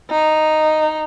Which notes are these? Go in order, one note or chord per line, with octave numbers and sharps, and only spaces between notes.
D#4